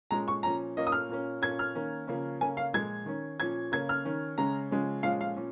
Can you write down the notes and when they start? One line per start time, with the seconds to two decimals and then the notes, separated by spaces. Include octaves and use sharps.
0.11 A#2 G#3 C#4 A#5
0.28 C#6
0.43 A#2 F3 C#4 A#5
0.77 A#2 A#3 C#4 D#5
0.87 D#6
0.92 F6
1.09 A#2 A#3 C#4
1.42 A#2 A#3 C#4 G#6
1.59 F6
1.75 D#3 A#3 C#4
2.07 C#3 F3 A#3 C#4
2.41 C#3 A#3 C#4 G#5
2.57 F5
2.73 A#2 F3 G#3 G#6
3.06 D#3 C#4
3.40 A#2 F3 C#4 G#6
3.72 C#3 A#3 C#4 G#6
3.89 F6
4.05 D#3 C#4
4.38 C#3 G#3 C#4 A#5
4.71 C#3 F3 G#3 C#4
5.03 A#2 F3 G#3 C#4 F5
5.21 F5
5.37 A#2 C#4